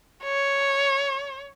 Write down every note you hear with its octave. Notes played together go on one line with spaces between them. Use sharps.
C#5